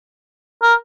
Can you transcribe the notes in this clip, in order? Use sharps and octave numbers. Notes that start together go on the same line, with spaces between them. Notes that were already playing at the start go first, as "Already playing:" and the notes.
A#4